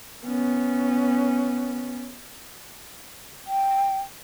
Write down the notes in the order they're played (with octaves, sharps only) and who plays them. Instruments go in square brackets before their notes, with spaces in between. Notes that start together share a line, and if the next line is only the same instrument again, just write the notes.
[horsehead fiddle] B3 C#4
[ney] G5